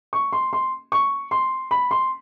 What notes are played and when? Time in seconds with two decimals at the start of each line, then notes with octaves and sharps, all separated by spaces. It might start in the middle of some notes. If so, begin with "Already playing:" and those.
0.13 C#6
0.33 C6
0.53 C6
0.92 C#6
1.31 C6
1.71 B5
1.91 C6